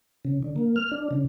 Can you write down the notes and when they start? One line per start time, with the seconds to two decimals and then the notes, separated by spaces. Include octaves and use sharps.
0.25 C#3
0.43 D3
0.56 A#3
0.76 F6
0.92 D4
1.11 C#3